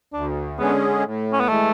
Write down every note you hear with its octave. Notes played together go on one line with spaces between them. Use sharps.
D2 D4
D3 G#3 B3 C#4 G#4
A2
C#4
B3
E3 G#3 A3